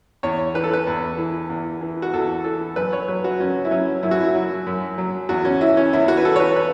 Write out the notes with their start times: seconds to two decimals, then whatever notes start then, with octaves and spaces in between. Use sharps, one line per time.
0.23 E2 C#5
0.54 E3 B4
0.64 A4
0.73 B4
0.87 E2
1.18 E3
1.50 E2
1.81 E3
2.02 F#4
2.13 E2 A4
2.44 E3 A4
2.76 F#2 B4
2.93 C#5
3.08 F#3 B4
3.24 F#4
3.40 F#2 C#4
3.65 E4
3.71 F#3 C#4
4.03 F#2 E4
4.11 F#4
4.21 E4
4.35 F#3
4.67 F#2
4.98 F#3
5.29 E2 F#4
5.45 C#4
5.61 E3 E4
5.77 C#4
5.93 E2 E4
6.08 F#4
6.17 B4
6.25 E3 A4
6.36 C#5
6.40 B4
6.56 B4